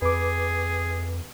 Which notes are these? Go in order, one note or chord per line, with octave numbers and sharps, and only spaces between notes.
F2 G#4 B4 D6